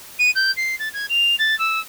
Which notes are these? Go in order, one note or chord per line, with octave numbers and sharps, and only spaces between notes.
D#7
G6
C7
A6
G#6
F7
A6
E6